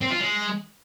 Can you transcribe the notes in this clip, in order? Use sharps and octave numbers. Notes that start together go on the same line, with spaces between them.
C4
F4
G#3